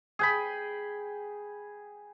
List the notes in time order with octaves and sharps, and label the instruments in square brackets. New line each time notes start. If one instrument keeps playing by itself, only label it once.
[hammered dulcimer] G#4 G5 B5